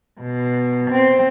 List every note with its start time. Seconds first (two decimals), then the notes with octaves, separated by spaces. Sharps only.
0.21 B2
0.91 C4